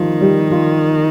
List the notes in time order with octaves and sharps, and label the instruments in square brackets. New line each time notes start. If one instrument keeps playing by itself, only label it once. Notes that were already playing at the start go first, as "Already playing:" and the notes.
Already playing: [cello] D#3 [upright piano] F3 G3 F4
[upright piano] G3 G4
F3 F4